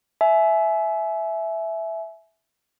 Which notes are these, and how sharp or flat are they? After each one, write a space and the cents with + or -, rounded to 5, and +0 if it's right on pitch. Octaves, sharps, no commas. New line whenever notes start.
E5 +0 G#5 +35